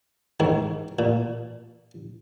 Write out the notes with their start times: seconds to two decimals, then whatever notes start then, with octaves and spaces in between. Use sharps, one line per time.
0.40 G#2 D#3
0.99 A#2